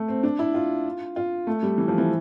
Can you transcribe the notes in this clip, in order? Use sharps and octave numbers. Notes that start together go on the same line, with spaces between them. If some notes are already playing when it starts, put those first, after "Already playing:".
Already playing: A3
C4
D4
E4
F4
F4
A3
G3
E3
F3
E3